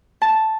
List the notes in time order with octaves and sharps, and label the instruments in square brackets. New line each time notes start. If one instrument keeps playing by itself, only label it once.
[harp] A5